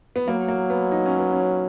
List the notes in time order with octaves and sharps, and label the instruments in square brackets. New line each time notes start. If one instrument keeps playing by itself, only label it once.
[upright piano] B3
[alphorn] F#3 [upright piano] A#3
[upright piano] A#3
B3
D#4
C#4
B3
C#4